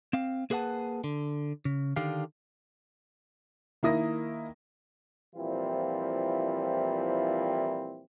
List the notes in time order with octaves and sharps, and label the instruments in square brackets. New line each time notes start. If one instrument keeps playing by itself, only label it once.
[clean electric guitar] C4 F5
A#3 G#4 B4 D5 F#5 A5
D3
C#3
D3 D#3 D4 G4 F5
[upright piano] D#3 A#3 E4 D#6 A#6
[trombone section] A#2 E3 F3 G3 C4 E4